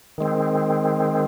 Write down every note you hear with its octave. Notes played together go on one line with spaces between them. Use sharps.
D#3 G#3 C4